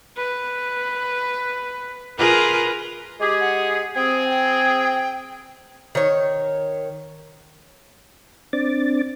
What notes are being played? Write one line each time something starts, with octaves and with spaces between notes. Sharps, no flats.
B4
F4 G#4 A#4 B4
G#3 G4 G#4 D6
F#5
C4 G#4 G5
G5
D#3 C#5
C4 D4 D6 A6